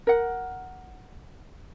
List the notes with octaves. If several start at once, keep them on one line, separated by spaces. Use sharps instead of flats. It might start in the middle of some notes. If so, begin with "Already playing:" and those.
A#4 F#5